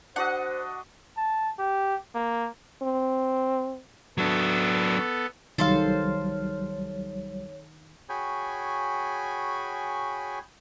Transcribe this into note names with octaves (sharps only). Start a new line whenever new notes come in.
D4 F#4 C5 D#5 F#5
A5
G4
A#3
C4
F#3 B3 D4 A4
C2 D#3 F#3 G3 A4 C5 C#5 F5
F#4 G#4 C#5 G5 G#5 B5